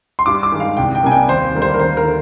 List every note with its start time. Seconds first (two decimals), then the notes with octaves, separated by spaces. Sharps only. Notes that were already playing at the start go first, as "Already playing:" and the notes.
0.19 C6
0.26 G2 D6
0.43 D6
0.52 D#3 G#3
0.60 F5
0.77 C2 G5
0.95 G5
1.03 C3 G3 A#3 G#5
1.12 G5
1.28 D#2 C5
1.54 D3 G3 A#3
1.62 C5
1.74 A#4
1.79 D#2 C5
1.97 A#4
2.05 D3